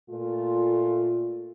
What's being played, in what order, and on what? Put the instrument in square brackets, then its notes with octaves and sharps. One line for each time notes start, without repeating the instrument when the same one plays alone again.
[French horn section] A#2 A3 F4